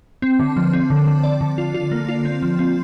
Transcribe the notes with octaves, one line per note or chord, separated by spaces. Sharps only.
C4
D3
F3
C4
D3
D3
D5
D3
F4
F4
A#3
F4
C4
F3
C4